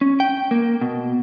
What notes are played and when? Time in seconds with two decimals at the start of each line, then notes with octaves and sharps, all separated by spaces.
0.01 C#4
0.20 G5
0.51 A#3
0.81 B2